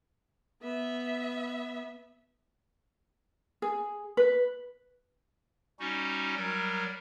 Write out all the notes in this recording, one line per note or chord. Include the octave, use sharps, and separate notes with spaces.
B3 E5
G#4
B4
G3 C#4 D#4 F#4
F#3 G3 A#4